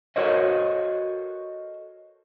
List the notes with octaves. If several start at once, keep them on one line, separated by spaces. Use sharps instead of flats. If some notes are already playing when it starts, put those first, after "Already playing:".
F#4 A4 A#4 C5 C#5 D#5